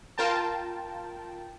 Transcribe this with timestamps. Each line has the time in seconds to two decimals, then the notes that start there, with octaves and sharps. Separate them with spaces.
0.18 F4 A#4 G5 A5